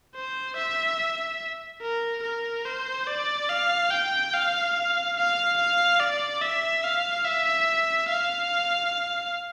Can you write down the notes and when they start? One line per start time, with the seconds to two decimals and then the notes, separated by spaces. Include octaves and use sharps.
0.15 C5
0.57 E5
1.81 A#4
2.23 A#4
2.65 C5
3.07 D5
3.49 F5
3.90 G5
4.33 F5
5.17 F5
5.58 F5
6.00 D5
6.42 E5
6.84 F5
7.25 E5
8.09 F5